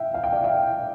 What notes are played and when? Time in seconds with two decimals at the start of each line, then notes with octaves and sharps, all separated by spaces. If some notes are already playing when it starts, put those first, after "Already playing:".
Already playing: E5 F5 G5
0.14 F5
0.24 G5
0.33 D5 F5
0.44 E5 G5